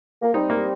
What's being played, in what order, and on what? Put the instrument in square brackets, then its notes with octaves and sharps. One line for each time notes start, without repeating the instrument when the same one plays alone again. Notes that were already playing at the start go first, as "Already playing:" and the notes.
[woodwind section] A#3
[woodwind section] G3 C4 [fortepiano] D#4
[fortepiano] A#3